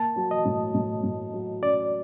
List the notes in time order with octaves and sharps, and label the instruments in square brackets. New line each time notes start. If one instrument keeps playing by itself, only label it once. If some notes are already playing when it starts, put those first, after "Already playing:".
Already playing: [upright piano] A#3 [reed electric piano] A5
[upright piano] F#3
[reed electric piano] D#5
[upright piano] A2
A2
A2
F#3
[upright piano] C#4 [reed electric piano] D5